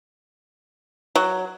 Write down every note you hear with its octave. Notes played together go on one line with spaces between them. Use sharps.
F#3